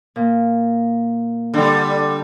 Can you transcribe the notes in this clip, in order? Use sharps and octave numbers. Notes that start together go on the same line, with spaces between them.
A#2
D3 G3 A4 G5